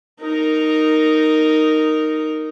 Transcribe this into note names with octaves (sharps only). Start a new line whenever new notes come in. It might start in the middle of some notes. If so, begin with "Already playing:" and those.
D#4 A#4